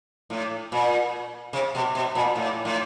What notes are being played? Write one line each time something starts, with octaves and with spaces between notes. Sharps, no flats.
A2
A#2
C3
B2
B2
A#2
A2
A2